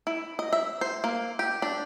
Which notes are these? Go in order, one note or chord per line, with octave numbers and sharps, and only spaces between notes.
E4
D#5
E5
C5
A#3
G4
D4